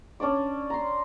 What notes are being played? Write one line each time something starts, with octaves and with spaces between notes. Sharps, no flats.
C#4 D4 D5 D6
A#5 C6